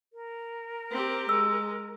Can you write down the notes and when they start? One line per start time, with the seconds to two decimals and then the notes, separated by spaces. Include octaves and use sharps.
0.13 A#4
0.91 C4 G4
1.29 G#3 E6